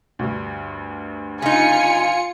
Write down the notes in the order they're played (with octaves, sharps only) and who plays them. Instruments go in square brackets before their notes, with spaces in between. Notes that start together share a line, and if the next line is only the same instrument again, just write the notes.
[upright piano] D2 G2
[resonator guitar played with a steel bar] C#3 D#4 [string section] F4 C#7 [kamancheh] G#5